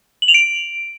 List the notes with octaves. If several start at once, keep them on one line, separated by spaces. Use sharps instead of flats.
F#7
F7
D7